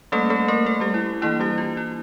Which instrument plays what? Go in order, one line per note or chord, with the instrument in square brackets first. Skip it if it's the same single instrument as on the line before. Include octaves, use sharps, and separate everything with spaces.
[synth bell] G3 A3 A#3 C#4 A4
A3 A4
A#3 A#4
A3 A4
G3 G4
E4
E3 A#3 D4 E4
G3 G4
F4
E4